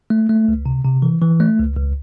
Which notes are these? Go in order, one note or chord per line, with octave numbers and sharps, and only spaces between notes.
A3
A3
C#2
C3
C3
E3
E3
A3
C#2
C#2